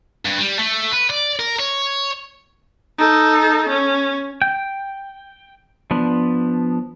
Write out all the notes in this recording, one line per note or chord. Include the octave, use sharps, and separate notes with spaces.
G2
G3
A3
B4
D5
A#4
C#5
D#4 A4
C#4
G5
F3 B3 D4